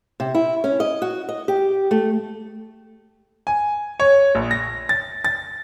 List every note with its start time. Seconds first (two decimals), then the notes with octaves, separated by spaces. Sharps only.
0.20 C3
0.35 E4
0.64 C#4
0.80 D#5
1.02 F#4
1.29 D#5
1.48 G4
1.91 A3
3.47 G#5
4.00 C#5
4.35 A#1
4.51 A#6
4.89 A6
5.24 A6